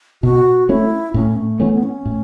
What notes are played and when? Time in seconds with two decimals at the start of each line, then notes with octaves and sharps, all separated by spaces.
0.23 B2 F#4
0.68 A3 C#4 E4
1.14 A2 C#4
1.36 A3
1.59 E3 A3 B3 C#4
1.73 B3
1.83 C#4
2.06 A2